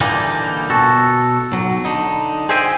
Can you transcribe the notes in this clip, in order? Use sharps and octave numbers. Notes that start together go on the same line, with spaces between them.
A#2 D3 E3 G3 A#3 D#4
B2 F#4 A4
B1 F#3
D3 D#4
G#4 C5 D#5 E5 G5 G#5